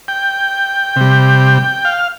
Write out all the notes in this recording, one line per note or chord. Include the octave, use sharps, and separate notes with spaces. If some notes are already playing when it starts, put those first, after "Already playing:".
G5
C3 G3
F5